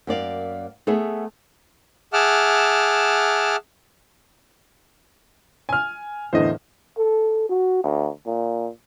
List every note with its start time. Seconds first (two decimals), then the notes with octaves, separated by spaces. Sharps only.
0.07 F#2 A#3 D5 F5
0.87 A3 B3 G#4 E5
2.13 G#4 E5 F#5 A5 D6 F6
5.69 G#5 F6
6.33 E2 A2 D3 C5 D#5
6.98 A4
7.49 F#4
7.84 D2
8.26 A#2